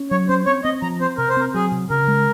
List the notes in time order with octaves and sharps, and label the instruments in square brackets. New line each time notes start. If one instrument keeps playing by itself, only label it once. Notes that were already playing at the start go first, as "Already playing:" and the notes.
Already playing: [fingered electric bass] C#4
[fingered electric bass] F#3 [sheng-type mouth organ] C#5
[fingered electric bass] C#4 [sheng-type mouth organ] C5
[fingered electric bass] C4 [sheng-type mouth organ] C#5
[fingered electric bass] C4 [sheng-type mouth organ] D#5
[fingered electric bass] F3 [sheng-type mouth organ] A#5
[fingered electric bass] C4 [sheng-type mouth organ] C5
[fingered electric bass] C3 [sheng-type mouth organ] A#4
[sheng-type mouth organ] C5
[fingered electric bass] C4 [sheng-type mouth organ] A#4
[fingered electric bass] F#3 [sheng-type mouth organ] G#4
[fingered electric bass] C3
[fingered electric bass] C#3 [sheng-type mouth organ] A#4
[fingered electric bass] G#3